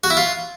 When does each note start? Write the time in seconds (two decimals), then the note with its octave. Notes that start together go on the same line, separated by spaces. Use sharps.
0.04 F#4
0.10 E4
0.17 F4